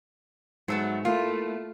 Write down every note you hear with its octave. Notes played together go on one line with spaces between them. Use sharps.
G#2 F#3 A3 B3 E6
A3 A#3 E4 F4